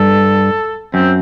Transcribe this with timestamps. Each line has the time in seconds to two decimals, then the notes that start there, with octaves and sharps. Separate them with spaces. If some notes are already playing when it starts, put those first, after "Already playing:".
Already playing: G2 A4
0.94 F#2 C4